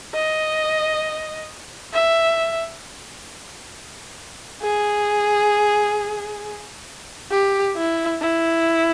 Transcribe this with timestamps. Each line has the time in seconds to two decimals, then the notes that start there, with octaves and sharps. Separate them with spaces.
0.14 D#5
1.93 E5
4.62 G#4
7.31 G4
7.76 E4
8.21 E4